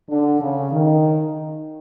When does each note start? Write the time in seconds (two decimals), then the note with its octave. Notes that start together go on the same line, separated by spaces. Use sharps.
0.10 D3
0.41 C#3
0.72 D#3